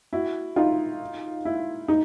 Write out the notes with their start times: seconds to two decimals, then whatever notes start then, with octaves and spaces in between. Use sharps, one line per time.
0.13 E4 F#4
0.56 D#4 F4
1.45 E4
1.88 D#4